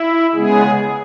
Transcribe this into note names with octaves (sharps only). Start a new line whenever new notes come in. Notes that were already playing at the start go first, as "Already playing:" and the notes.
Already playing: E4
C#3 G#3 B3 G#4